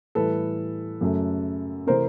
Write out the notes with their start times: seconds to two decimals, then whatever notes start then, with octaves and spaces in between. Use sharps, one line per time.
0.15 A2 E3 G3 A4 B4
1.01 F#2 C#3 F#3 A3
1.87 C3 E3 A3 C4 A#4 C5